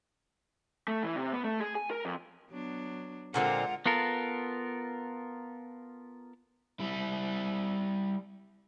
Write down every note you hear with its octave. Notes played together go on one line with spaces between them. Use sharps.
A3
E3
C3
B3
A3
G#4
G#5
A#4
F2
F#3 B3 D4
A#2 D3 G#3 C4 F4 A#4 F#5
B3 F4 A4 A#4
G3 E4